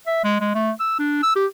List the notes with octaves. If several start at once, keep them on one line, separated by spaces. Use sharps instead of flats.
E5
G#3
G#3
A3
E6
D4
E6
G4